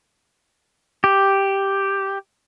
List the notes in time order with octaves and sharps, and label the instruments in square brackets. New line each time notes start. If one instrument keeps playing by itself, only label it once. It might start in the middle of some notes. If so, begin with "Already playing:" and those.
[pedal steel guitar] G4